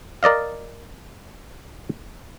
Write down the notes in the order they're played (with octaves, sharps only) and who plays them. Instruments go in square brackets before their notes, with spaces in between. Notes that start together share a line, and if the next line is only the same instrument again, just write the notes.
[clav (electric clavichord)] A#4 D5 D#5 F5